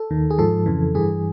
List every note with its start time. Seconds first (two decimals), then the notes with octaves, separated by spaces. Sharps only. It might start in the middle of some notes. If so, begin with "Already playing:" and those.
Already playing: A4
0.10 D#2 D#3
0.30 G#4
0.38 G#2 F3 A4
0.66 F2 C#3 E3
0.95 G2 E3 G#4